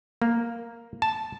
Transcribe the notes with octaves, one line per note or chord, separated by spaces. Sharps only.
A#3
A5